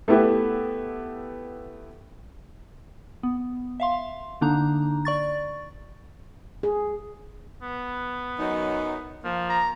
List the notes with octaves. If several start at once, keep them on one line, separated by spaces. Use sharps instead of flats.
A3 B3 E4 G4 B4
B3
E5 F5 C6
D3 A#3 D4 D#4 A#5
D5 C#6 A6
G#4
B3
F#2 F#3 D#4
F3 A#3
A#5